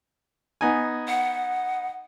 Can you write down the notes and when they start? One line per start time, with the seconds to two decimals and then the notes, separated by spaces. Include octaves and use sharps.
0.61 B3 D#4 G#5
1.09 F#5